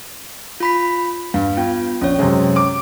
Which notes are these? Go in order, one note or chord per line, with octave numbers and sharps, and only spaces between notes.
F4 B5 B6
G2 F5
B3 F4 G5
A#1 C#4 C#5
F#2 C3 G#3
D6